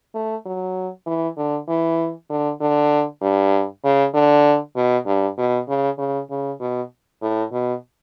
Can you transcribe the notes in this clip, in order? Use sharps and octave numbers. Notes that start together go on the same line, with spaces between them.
A3
F#3
E3
D3
E3
D3
D3
G2
C#3
D3
B2
G2
B2
C#3
C#3
C#3
B2
A2
B2